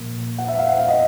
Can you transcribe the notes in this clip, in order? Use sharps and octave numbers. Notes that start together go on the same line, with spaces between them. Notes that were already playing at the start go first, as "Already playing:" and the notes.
Already playing: A#2 F3 A#3
F#5
E5
F5
F#5
F5
D#5